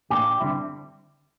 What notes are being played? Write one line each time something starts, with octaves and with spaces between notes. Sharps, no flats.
A2 E3 A#3 D4 G4
D3 G3 C4 E4